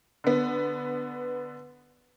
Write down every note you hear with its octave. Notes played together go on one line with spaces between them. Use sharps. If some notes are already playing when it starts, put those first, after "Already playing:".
D3 B3